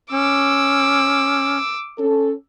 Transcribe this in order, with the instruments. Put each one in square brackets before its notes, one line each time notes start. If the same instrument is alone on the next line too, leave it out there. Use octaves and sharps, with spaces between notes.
[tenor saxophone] C#4 [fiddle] D6 E6
[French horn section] C#4 A4